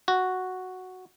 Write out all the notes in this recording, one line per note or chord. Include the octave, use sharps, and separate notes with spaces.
F#4